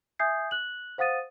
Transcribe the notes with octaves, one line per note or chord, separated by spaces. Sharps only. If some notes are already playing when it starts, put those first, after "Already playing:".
E5 G#5 D#6 G6 G#6 C7
F#6 F#7
C5 F5 F#5 D#6 A6 D#7